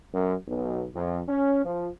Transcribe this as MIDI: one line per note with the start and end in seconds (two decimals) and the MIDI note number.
0.14 0.34 42
0.47 0.87 35
0.95 1.21 41
1.28 1.62 61
1.65 1.89 53